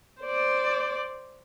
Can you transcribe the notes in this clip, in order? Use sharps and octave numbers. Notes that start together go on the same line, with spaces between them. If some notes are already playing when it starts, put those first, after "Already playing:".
C5 D5